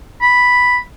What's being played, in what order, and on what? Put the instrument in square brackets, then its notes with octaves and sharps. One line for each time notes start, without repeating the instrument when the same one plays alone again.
[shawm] B5